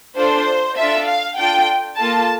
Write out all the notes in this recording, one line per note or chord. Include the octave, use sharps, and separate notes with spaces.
D4 F4 A4 C5
D4 F4 A4 E5
F5
D4 F4 A4 G5
A#3 F4 A4 A5